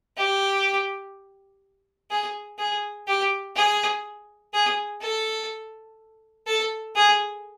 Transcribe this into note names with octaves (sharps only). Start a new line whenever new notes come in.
G4
G#4
G#4
G4
G#4
G#4
A4
A4
G#4